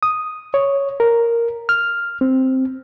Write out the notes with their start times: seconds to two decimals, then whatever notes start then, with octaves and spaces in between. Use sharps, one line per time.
0.03 D#6
0.54 C#5
1.00 A#4
1.69 F6
2.21 C4